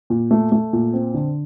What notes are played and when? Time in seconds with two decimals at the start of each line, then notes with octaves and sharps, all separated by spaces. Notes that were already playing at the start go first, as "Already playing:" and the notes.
0.10 A#2
0.31 A3
0.52 A3
0.73 A#2
0.93 C4
1.14 D3